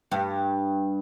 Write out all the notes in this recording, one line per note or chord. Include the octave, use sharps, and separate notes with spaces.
G2